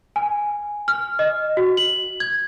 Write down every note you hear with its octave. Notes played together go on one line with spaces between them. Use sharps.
G#5
F6
D#5
F#4
F#7
G#6